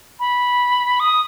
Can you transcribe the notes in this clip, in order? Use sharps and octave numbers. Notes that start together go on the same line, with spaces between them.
B5
D#6